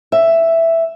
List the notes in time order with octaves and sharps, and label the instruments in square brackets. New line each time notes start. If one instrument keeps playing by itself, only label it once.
[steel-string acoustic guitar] E5